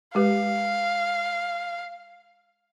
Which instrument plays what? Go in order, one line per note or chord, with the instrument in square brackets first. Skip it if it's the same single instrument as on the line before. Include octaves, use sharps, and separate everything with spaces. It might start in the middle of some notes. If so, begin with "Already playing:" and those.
[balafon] G#3 G4 B4 [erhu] F5